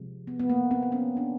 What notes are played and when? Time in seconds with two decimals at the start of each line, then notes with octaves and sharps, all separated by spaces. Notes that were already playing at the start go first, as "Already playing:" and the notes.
Already playing: C3 F3 G#3
0.27 B3
0.39 B3
0.49 A#3
0.71 A#3 C4
0.83 C4
0.92 B3 C#4
1.17 D4